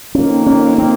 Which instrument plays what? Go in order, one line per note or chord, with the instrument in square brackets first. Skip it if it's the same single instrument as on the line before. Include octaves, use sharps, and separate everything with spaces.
[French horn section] F2 D#3 A#3 D#4 [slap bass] C#4
[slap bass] C#4
C4